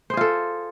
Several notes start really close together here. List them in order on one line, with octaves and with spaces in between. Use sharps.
C5 G#4 F4 A4